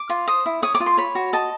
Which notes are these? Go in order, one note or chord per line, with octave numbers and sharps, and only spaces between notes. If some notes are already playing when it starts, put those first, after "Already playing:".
Already playing: D6
F4
C5 D#6
E4
C#5 D#6
D6
F4
C6
C#5 B5
F#4
D#5 A5